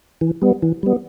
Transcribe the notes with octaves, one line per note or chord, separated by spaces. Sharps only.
E3
G3 B3
E3
G3 B3